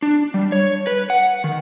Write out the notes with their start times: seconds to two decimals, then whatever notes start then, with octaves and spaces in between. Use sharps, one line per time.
0.02 D4
0.34 G3
0.52 C#5
0.87 B4
1.10 F#5
1.44 D#3